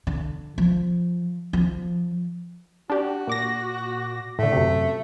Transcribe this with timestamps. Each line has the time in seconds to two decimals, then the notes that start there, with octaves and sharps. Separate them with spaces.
0.07 D3
0.58 F3
1.53 F3
2.90 D4 F#4 G4
3.27 A#2 D6 A#6
4.39 A2 D3 A3
4.53 F#2 C3